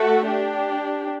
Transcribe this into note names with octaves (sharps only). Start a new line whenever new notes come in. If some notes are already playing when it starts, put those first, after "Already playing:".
Already playing: A3 F#4 A4
D4 G4